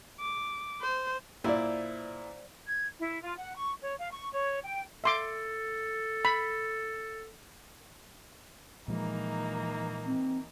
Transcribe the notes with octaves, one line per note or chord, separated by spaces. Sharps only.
D6
C5
A#2 E4 C5 D5
G#6
E4
F4
F#5
C#6
C#5
F5
C#6
C#5
G5
A4 E5 C6 D6
B5
A#2 E3 F3 G#3 A#3 D#4
C4